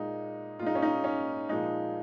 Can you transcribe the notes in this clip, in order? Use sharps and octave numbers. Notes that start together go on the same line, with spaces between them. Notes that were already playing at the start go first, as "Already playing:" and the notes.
Already playing: A#2 G#3 D#4
A#2 G#3 D#4 F4
C#4
D#4
C#4
A#2 F3 G#3 D#4